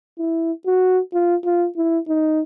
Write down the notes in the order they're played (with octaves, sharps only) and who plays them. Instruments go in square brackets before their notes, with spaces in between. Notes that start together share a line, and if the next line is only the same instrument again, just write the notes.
[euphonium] E4
F#4
F4
F4
E4
D#4